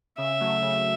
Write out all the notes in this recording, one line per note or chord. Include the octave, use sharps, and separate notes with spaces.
C#3 E5
F#3 A3
C#3